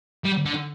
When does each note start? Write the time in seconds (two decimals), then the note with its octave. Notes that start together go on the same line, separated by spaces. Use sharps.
0.24 G3
0.45 D3